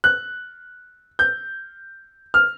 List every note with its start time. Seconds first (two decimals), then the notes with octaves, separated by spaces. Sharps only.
0.04 F#6
1.19 G6
2.34 F6